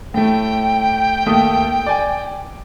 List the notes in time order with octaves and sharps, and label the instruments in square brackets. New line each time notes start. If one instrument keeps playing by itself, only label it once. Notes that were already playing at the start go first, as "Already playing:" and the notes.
[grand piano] A2 A3 [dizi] G5
[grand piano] D#2 A3 D#6
D5 G#5